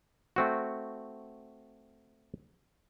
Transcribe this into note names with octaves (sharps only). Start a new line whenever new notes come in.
A3 C4 F#4